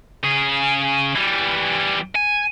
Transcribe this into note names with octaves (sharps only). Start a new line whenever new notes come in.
C#3 G#4
E3 G3
G#5